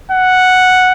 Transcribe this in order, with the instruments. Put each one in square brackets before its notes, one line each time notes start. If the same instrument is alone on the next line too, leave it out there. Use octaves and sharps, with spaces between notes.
[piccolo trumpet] F#5